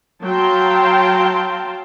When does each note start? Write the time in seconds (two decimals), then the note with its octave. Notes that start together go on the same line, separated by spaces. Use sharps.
0.23 F#3 F5 G5 A5 A#5 C6